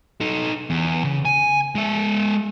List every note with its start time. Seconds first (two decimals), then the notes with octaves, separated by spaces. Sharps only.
0.21 D#4 A4
0.70 E2
1.04 C#3
1.25 G#5
1.75 G#3 E5